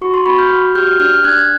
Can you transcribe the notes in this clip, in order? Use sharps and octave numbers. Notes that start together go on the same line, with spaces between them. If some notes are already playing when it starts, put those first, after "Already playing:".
F#4 C#6
C6
F#4 B5 C#6
F6 G6
F#4
G4 F6 G6
D4 F6 G6
D4 F#6 G#6